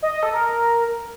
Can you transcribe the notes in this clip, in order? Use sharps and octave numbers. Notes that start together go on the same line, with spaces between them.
D#5
D#5
A4
A#4